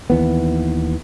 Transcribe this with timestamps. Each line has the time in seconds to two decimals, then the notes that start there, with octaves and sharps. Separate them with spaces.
0.10 D#2 E3 B3